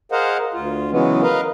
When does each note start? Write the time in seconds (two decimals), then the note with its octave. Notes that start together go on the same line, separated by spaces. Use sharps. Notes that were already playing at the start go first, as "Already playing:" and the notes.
0.12 G#4 A#4 C5 D#5 F5 F#5
0.54 D2 F4
0.91 C#3 E3 F#3 G#3 B3 C#4
1.22 A#4 B4 D#5 F5